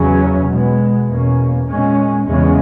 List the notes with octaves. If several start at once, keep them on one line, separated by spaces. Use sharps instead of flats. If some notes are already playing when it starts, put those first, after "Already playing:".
Already playing: E2 C#3 F#3 C#4
B2 G#3 B3
E2 B2 A#3 C#4
A#2 G#3 C#4
E2 C#3 G#3 C#4